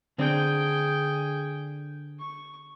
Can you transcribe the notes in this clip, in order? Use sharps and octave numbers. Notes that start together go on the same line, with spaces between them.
D3 C4 D4 G#4 G5
C#6